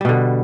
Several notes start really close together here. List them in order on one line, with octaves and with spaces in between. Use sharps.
G3 B2 D3